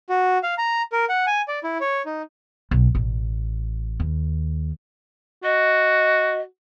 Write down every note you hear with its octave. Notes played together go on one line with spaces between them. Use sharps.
F#4
F5
A#5
A#4
F#5
G#5
D5
E4
C#5
D#4
B1
A1
D#2
F#4 D#5